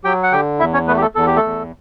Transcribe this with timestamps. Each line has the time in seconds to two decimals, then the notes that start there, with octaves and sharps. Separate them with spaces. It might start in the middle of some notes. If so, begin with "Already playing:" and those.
0.04 F#3 G4 G5
0.23 F#5
0.32 D3 G4 G5
0.59 E2 E4 E5
0.73 C#4 C#5
0.87 A3 B3 B4
0.97 G4
1.02 A3 A4
1.15 E2 A4
1.26 G4
1.36 A3 A4
1.43 E2